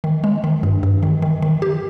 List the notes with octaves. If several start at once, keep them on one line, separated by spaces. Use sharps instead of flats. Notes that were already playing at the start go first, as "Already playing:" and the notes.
D#3
G#3
D#3
G2
G2
D#3
D#3
D#3
G4